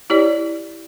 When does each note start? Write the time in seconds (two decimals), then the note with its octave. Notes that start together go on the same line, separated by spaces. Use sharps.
0.10 E4 G4 C#5 D5